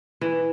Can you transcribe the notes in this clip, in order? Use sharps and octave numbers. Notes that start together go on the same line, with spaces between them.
E3